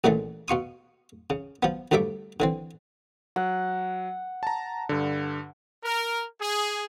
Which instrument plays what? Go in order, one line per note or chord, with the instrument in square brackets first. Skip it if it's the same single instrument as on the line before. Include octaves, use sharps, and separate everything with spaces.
[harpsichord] A#1 A#2 C#3 E3 G#3 A3
B2 F4 C#6 D#6
C#3
F3 B3
D2 G2 F3 A3 E5 D6
D3 E3 C4
[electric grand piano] F#3 [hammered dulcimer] F#5
[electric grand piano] A5 A#5
G2 D3
[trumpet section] A#4
G#4